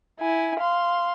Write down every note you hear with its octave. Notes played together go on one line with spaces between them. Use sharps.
E4 G#5
F5 C6